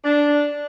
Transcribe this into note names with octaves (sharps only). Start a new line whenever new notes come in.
D4